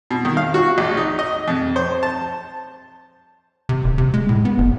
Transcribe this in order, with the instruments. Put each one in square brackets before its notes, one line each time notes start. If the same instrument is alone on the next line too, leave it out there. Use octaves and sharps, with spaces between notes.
[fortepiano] B2
D#3
F5
F#4
A#1
D#4
D#5
F2
C5
A5
[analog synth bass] C3
E1
C3
G#3
A2
B3
F#1